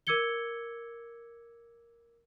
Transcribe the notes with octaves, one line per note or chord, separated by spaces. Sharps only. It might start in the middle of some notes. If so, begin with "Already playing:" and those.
A#4 D6 E6 G#6 C#7 G7